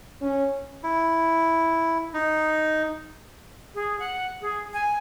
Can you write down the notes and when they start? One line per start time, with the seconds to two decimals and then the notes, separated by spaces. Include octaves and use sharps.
0.22 C#4
0.83 E4
2.14 D#4
3.75 G#4
4.00 F#5
4.41 G#4
4.73 G#5